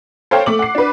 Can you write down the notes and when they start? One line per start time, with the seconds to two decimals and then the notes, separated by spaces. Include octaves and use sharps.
0.31 A4 C5 C#5 F5 G5
0.46 A3 D6 F#7
0.59 F#5 C7
0.75 D4 B4